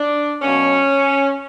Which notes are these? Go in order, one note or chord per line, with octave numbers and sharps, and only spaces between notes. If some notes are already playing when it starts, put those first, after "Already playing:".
Already playing: D4
B2 F#3 A#3 C#4